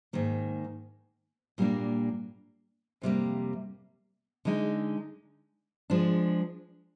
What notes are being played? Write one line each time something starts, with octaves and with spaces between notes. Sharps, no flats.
G#2 D#3 A#3
A#2 G3 A#3 D4
F2 C3 D#3 G3 A#3
D3 G#3 D#4
F3 G#3 D4